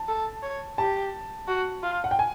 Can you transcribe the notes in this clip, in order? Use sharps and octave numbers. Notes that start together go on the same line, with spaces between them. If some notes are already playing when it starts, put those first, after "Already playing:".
Already playing: A5
A4
C#5
G4 A5
F#4
F4
F#5
G5
G#5